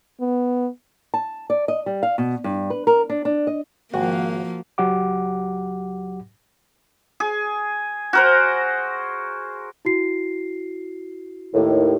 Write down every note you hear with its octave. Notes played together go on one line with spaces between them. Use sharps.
B3
A5
D5
D#5
G3
F5
B2
G2
B4
A#4
D4
D4
D#5
G#1 F3 A#3 F#4
C#2 F#3 G4 F#5 D6
G#4
F#4 A#4 C5
E4 F#4 C7
D#2 A2